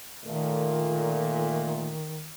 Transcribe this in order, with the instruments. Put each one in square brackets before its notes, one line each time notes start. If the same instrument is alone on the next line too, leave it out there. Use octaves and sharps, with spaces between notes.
[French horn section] A#2 A3 [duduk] D#3